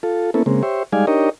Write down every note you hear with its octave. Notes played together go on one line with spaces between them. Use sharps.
F4 A4
A#3 B3 C#4 E4 A4
C#3 G#3 A#3 C4
G4 C5 C#5 E5
G3 G#3 D#4 D5 F5 G#5
D4 D#4 G4 A#4 C#5 D#5